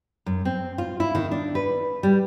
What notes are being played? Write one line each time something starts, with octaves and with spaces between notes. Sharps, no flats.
F#2
C4
F4
E4
D#3
D4
B4
G3